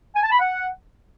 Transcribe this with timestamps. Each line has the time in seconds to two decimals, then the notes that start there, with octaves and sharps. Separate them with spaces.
0.15 G#5
0.23 A5
0.32 B5
0.40 F#5